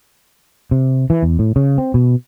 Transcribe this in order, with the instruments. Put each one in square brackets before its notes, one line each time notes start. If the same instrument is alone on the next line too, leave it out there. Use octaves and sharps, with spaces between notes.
[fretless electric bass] C3
E3
E2
A2
C#3
C4
B2